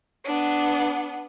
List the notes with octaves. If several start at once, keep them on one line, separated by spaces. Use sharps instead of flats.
B3 D4